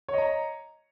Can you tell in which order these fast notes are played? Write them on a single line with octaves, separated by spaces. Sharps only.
C#5 D#5 A#5